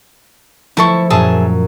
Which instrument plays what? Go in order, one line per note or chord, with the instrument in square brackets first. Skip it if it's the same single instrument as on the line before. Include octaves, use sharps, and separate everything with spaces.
[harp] F3 A3 [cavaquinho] E4 A4 C#6
[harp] F#2 A#2 [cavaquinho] G#4 E5 A5